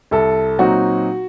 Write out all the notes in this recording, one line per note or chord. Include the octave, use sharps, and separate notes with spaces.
C2 A4
A#2 F#3 C4 D#4 F#4